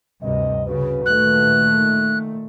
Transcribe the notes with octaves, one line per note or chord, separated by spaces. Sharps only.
D2 G2 C3 D#5
C#3 F#4 B4
A#2 D#3 A3 F#6